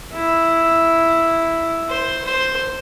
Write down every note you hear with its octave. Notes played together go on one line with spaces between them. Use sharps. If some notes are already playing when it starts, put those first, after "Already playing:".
E4
C5
C5